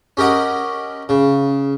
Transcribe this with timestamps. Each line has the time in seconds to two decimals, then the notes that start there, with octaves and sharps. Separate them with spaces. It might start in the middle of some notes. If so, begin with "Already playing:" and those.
0.17 C#4 G4 A#4 D#5 F#5
1.09 C#3